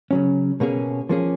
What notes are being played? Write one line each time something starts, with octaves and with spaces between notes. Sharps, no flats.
C#3 F#3 C#4
B2 A#3 C#4 G#4
F3 A#3 C#4 G#4